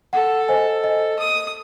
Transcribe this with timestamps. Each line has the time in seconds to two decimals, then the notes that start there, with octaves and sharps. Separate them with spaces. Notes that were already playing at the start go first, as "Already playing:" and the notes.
0.13 A4 F#5
0.48 C5 D#5 G#5
0.84 D#5
1.19 D#6